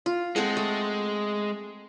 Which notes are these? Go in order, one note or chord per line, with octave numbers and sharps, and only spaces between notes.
F4
G#3 C4 A4 F#5
A3